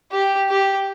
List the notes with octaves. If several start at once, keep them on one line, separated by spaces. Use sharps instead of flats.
G4
G4